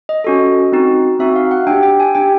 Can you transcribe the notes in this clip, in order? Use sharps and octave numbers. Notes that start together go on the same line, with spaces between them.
D#5
C#4 F#4 A4
C4 D#4 F#4
C4 D#4 F#4 E5
F5
F#5
D4 G4 G5
G5
G#5
D4 G4 G5